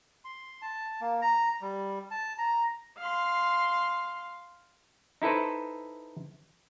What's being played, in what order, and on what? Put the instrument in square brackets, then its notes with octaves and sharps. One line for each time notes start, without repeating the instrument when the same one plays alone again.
[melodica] C6
A5
A#3
A#5
G3
A5
A#5
[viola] F5 C6
[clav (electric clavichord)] D#4 E4 A4 B4 C5